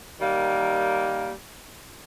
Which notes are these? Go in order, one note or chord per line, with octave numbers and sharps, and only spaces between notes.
D#3 G3 A#3